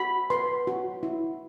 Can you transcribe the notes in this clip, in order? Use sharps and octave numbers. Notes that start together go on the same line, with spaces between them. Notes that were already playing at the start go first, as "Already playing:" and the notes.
Already playing: F#4 B5
B4 C6
F#4
E4